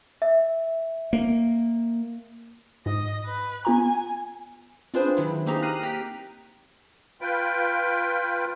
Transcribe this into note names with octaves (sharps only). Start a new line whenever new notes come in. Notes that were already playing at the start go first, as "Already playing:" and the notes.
E5
A#3
G#2 D#5
B4
B3 F4 G#5 A#5
C4 D4 F4 G#4 B4 C5
D#3 F#3 E4
A#3 C4 D#4 G4 G#4 A#5
F6 F#6 A#6 C7 D#7
G4 G5 A#5 B6
F4 B4 G5